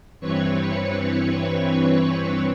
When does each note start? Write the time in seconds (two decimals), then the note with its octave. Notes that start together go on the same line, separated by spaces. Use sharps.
0.20 G2 E3 C4 B4 C#5 C#6